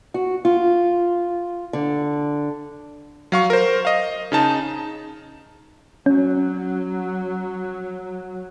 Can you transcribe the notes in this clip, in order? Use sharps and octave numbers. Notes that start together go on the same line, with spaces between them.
F#4
F4
D3
F#3 F5 C#6
A#4 C5
D#5 F5
C#3 D#4 A5
F#3 C#4